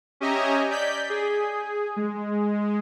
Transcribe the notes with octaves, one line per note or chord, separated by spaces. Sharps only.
C#4 G4 D#5 E5 G#5 A#5
D5 G6 B6
G#4
G#3